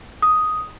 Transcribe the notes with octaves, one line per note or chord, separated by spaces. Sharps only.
D#6